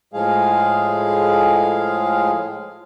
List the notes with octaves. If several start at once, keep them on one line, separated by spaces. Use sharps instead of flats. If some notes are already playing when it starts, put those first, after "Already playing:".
A2 F3 G#3 G#4 F5